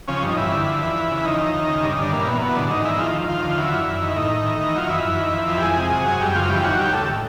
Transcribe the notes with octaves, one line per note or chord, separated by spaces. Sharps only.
C#3 F3 C#4
G2 D#4
G2 E3 E4
D3
F3
E2
E2
C#3
E4
D#3 F3 D#4
D#2
D#2
C#3
G2 D4
D#4
G2 D3 D4
A#2 E3 A#3
B2 E3 B3
B2 F#3 B3
G#2 D3 D4
G#2 D#3 D#4
D#3 E3 E4
F3 F4
D#2
D#2 F3 F4
D3
E3 F#3 E4
F#2
F#2
D#3
E4
A2 D#3 D#4
A2
E3
E3
F#3 F4
F#2 E3 E4
F#2
D#3
F3
F2
G4
F2 G#3 G#4
C3
F#3
F#2
F#2 G3 G4
C#3 F3 F4
E3 G3 G4
D#2 F#3 F#4
D#2 G3 G4
C#3 A3 A4
A2